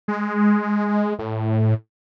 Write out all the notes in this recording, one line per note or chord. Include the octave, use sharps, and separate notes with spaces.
G#3
A2